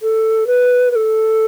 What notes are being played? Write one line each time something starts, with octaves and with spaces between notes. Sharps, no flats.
A4
B4
B4
A4